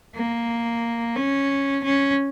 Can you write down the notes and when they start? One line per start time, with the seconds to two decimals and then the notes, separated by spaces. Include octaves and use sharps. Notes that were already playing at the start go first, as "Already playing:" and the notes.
0.15 A#3
1.16 C#4
1.84 C#4